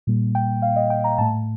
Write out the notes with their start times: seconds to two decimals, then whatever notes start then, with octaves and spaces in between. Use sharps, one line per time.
0.07 A#2 G3 A#3
0.35 G5
0.62 F5
0.76 D#5
0.90 G5
1.04 A#5
1.18 A2 A3 A5